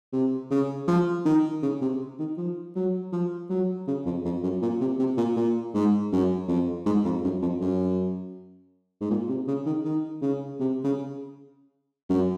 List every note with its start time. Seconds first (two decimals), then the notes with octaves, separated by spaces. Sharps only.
0.13 C3
0.51 C#3
0.88 F3
1.25 D#3
1.62 C#3
1.82 C3
2.19 D#3
2.37 F3
2.76 F#3
3.12 F3
3.50 F#3
3.87 C#3
4.05 F2
4.25 F2
4.43 F#2
4.62 A#2
4.81 C3
4.99 C3
5.17 A#2
5.36 A#2
5.74 G#2
6.12 F#2
6.48 F2
6.86 G#2
7.05 F2
7.24 F#2
7.42 F2
7.61 F#2
9.01 G#2
9.10 A#2
9.29 C3
9.48 C#3
9.66 D#3
9.85 D#3
10.22 C#3
10.60 C3
10.84 C#3
12.09 F#2